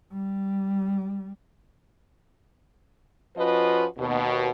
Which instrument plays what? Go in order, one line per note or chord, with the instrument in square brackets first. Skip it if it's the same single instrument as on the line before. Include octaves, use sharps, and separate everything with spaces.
[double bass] G3
[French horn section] F3 C#4 F4 F#4 B4 D#5
D#2 B2